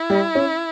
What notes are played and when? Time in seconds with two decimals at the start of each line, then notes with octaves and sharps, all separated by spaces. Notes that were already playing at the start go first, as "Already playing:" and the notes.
Already playing: E4
0.10 G3
0.35 C#4